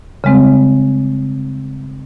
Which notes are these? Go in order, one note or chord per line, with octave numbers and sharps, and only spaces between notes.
C#3 G3 G#3 C4